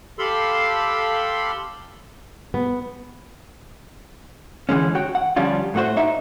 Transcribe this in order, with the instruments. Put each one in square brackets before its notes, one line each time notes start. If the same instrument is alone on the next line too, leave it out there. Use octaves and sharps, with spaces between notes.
[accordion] G4 A4 F5 B5 C6 E6
[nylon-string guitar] B3
[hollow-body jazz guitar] D3 E3 G#3 C#4
F#4 C#5 G5
F#5
D3 F3 G3 C#4 D4 F4
A2 A3 F#4 C5
D4 D#4 E5